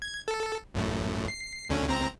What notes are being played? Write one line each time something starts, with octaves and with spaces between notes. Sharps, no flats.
G#6
A4
A1 F#2 A2
C7
D2 D3 C#4
C#2 C4 A#5